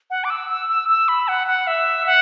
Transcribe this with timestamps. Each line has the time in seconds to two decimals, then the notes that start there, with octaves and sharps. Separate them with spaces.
0.10 F#5
0.24 D6
0.30 E6
0.49 E6
0.69 E6
0.89 E6
1.08 B5
1.28 F#5
1.47 F#5
1.67 E5
2.06 F#5